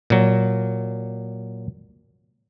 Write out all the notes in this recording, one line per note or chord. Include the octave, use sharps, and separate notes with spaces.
A#2 F#3